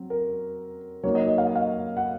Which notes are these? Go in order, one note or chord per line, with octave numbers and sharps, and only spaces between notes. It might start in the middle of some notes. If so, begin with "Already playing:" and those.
Already playing: F#3 C4
A#4
F#3 A#3 D#4 C#5
D#5
D#5
F5
D#5
F5
F#5